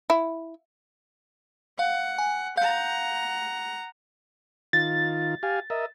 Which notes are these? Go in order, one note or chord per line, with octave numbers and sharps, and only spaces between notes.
E4
F5 F#5
G#5
F5 F#5 A#5 G6
D#3 F4 A6
G4 F5 G#5
A#4 D#5 E5